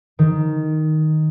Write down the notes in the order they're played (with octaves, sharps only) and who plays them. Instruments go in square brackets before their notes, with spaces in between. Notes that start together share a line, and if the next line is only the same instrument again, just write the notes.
[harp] D#3